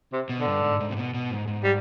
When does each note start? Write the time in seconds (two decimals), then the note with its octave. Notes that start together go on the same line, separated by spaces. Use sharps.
0.13 C3
0.30 B2
0.38 D3
0.46 G2
0.64 G#2
0.80 G#2
0.90 C3
0.97 B2
1.14 B2
1.30 G#2
1.47 G#2
1.64 G3